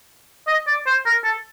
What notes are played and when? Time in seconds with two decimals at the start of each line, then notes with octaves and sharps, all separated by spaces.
0.47 D#5
0.67 D5
0.86 C5
1.05 A#4
1.24 A4